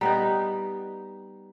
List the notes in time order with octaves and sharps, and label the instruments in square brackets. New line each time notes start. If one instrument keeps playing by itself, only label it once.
[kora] G3 B3 D#4 [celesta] A#5